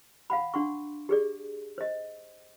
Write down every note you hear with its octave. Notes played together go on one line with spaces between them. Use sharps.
F5 F#5 B5
D4 F#5 C6 C#6
G4 G#4 D5
C5 D#5